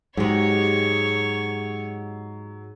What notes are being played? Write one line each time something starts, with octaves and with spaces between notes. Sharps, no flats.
G#2 F#3 G#3 G4 C#5